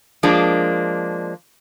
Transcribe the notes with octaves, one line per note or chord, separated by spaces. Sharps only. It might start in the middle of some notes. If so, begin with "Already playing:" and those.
F3 G#3 A#3 D4